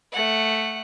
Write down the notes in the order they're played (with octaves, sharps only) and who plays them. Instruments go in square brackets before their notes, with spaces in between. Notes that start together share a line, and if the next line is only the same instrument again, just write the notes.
[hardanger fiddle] A3 F#5